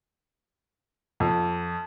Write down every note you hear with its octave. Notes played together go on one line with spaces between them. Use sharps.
F2